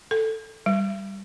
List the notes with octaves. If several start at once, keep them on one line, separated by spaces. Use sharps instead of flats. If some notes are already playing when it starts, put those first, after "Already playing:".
A4
G3